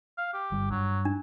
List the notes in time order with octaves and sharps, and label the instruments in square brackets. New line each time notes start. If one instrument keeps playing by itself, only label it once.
[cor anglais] F5
G4
[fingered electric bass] G1 G3
[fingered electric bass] G2 [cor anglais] F#3
[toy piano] D4